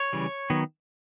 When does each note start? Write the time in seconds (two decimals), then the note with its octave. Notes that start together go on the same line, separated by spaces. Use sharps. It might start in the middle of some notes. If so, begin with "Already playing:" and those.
Already playing: C#5
0.13 C#3 E3 G3
0.50 D#3 F#3 B3